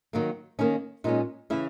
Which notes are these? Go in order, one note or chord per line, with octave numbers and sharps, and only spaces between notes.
D#3 F#3 A#3
D#3 A#3 C#4 D#4
A#2 G#3 C#4 D#4
C#3 E3 E4